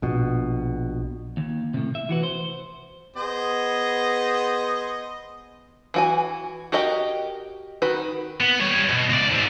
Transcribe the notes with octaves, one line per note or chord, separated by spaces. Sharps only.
A#1 B2
D#2
A2 C3
E5
E3 F#4 B4
C5
B3 G#4 C5 D#5
E3 F#4 G#5
F#4 G4 A#4 D#5 G5
D#3 F#4 B4
B3
G3 C#5
B2
C#2 D5
G#2 C4